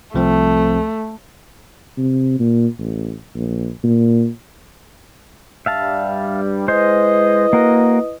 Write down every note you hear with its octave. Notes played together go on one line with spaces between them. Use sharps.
C2 F3 A3 C4
C3
A#2
A1
A#1
A#2
G2 G3 E5 F5 A5
G#3 E4 B4 C5 D#5
A#3 F#4 A#4